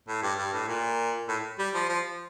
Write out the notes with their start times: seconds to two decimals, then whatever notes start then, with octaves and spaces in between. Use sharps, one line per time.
0.08 A2
0.23 G2
0.38 G2
0.53 A2
0.68 A#2
1.29 A2
1.59 G3
1.74 F3
1.89 F3